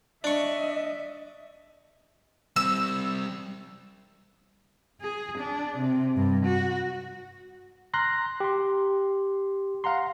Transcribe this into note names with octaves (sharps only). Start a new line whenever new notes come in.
D4 D#5 E5 C#6
G3 C4 E6
G#4
D4
C3
G2
F#4
A#5 C6 F6 F#6 A#6
G4 C6
F5 F#5 A#5 C6